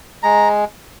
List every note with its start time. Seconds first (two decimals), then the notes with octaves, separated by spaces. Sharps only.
0.23 G#3 A#5